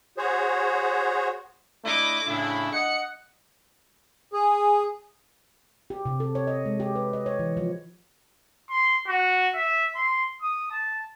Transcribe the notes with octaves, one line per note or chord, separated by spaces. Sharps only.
F#4 G#4 C5 C#5
A3 D4 E4 D#5 D6
A2 C#3 D4 E4
D#5 F#5 C#7
G#4
G4
C3
A4
C#5
D#5
G#3
G4
B4
D#5
C#5
E3
F3
C6
F#4
E5
C6
D#6
A5